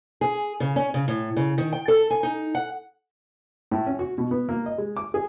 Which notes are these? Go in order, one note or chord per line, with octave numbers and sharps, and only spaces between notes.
G#4
C#3
C#4
C#3
A2
C#3
D#3
G5
A4
G#5
D#4
F#5
A2
C#4
F#4
B2
B3
A#3
D#5
G#3
D6
G#4